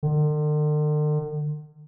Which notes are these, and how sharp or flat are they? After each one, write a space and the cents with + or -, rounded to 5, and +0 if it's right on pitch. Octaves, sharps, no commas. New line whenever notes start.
D3 +45